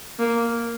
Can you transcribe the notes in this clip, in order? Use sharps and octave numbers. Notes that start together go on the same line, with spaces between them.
A#3